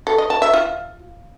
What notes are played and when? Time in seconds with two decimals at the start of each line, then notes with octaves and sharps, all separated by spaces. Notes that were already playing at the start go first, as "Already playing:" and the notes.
0.07 A4
0.18 D#5
0.30 A5
0.42 E5
0.54 F4